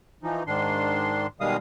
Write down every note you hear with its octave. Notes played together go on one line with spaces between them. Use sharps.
E3 F3 D#4
G#2 D#3 D4 C6
B2 D#3 G3 G#3 F5 D#6